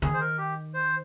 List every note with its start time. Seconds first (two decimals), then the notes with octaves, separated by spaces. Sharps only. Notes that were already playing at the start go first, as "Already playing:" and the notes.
0.02 D#3 G#4
0.14 C5
0.21 A#4
0.38 G4
0.74 C5